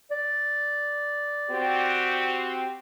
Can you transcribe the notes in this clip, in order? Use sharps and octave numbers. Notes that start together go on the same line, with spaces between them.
D5
C4 F#4 G4